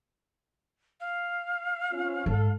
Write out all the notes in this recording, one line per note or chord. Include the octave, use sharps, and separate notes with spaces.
F5
C4 C#4 F4
G#2 A4